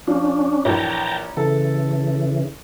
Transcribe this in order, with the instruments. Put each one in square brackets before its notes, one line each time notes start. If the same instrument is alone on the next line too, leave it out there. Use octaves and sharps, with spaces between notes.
[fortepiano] F3 [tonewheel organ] C#4 D4
[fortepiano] A#1 E3 C#5 [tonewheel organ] G5 A5 A#5
[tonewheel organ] C#3 E3 [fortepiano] A4